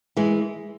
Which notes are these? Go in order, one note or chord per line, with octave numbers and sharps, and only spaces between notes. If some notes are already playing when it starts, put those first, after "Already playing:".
E3 G#3